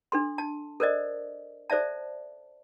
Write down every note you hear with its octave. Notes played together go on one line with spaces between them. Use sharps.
D4 A4 C6
A5
A4 A#4 C5 D5 D#5
A4 C5 D5 E5 A5